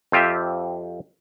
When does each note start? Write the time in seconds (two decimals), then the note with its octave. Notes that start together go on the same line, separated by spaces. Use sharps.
0.12 F2 C4 F4 G4 E5